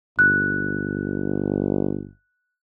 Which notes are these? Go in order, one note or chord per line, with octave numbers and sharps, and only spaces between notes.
G1 F#6